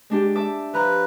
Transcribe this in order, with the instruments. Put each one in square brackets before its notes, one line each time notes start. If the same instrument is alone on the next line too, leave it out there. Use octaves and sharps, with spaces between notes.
[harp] G#3 D4 G4
E5 A5 D6
[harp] F3 A#5 F#6 [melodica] B4